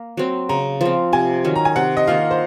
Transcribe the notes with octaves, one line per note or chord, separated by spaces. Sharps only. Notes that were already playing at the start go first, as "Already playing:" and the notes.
Already playing: A#3
F#3 C4
C#3 A#5
F3 C4
C3 G#5
D#3 F#3 C#4
A#5
G#5
C3 F#5
D#5
D#3 A#3 F4 F5
C5